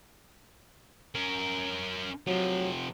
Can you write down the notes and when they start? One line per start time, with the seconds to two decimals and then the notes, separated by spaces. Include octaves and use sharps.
1.15 C#4 A#4
2.27 C3 F3 F#3